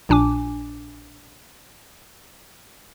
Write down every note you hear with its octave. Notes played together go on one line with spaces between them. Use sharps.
A#1 A#2 D4 G#5 D6